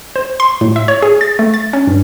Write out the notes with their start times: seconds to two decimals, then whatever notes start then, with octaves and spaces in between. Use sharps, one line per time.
0.16 C5
0.40 C6
0.61 A2
0.76 E5
0.88 C#5
1.02 G#4
1.21 A6
1.39 A3
1.54 A6
1.73 C#4
1.87 G2